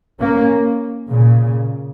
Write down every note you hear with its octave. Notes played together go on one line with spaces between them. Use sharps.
A#3 C#4
A#2 C#3